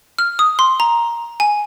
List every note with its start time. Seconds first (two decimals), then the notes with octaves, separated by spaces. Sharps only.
0.19 F6
0.39 D#6
0.59 C6
0.80 A#5
1.40 G#5